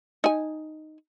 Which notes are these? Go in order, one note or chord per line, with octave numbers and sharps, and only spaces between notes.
D#4 G#5